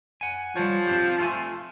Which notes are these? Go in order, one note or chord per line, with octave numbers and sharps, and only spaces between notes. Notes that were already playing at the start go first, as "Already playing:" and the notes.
F#5 G#5
F3 G3 C#5
C4 D4 G4
A3 F4 G#5